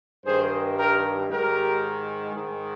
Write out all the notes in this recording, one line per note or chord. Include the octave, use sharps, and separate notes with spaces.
G2 D#3 G#4 C5
G4 A#4
G#2 D#3 G4 A#4
G#2 D#3